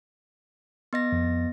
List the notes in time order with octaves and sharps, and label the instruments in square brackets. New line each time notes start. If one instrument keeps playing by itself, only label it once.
[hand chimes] B3 D#5 A#6
[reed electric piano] F2